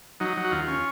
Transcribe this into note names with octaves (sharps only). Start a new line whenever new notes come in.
F#3 D#4
F#3
F#4
D#2 F4
C#4